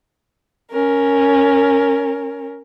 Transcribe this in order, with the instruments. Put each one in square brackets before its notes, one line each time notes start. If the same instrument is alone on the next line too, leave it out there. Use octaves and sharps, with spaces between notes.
[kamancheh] C#4 A#4